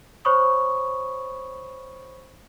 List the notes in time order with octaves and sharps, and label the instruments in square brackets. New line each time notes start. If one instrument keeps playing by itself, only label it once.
[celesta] C5 C#5 B5 C#6 D#6